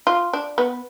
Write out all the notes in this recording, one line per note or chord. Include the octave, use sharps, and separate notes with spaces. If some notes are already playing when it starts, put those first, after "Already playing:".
F4
D4
B3